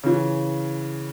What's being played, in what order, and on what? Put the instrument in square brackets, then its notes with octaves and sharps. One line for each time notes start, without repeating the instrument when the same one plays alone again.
[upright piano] C#3 E3